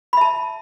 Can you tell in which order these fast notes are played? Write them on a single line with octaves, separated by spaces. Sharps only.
B5 E5 A5